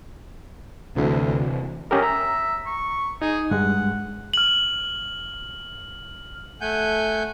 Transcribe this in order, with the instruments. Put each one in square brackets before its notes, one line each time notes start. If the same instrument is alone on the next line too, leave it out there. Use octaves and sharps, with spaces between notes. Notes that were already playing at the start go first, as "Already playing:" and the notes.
[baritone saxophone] D2 [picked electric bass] C3 E3
[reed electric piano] C#4 G4 A#4 [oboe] D#5
[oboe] E5 [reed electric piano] A#5
[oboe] C#6
[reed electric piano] D#4 [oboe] G#4
[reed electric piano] G2 G#3 [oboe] F#5
[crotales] F6 F#7
[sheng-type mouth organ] A3 F#5 G#5 G6